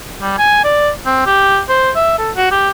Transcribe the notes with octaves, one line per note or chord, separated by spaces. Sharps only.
G3
G#5
D5
C4
G4
C5
E5
A4
F#4
G4